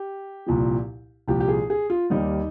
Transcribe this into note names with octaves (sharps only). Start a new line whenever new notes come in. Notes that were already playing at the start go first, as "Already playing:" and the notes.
Already playing: G4
C2 A#2 F3
C2 A#2 F3 G4
G4
G#4
G#4
F4
D#2 D#3 G3 D#4